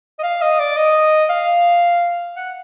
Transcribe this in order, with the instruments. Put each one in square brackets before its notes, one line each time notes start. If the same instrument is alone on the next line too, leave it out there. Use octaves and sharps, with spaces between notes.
[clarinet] D#5
F5
D#5
D5
D#5
F5
F#5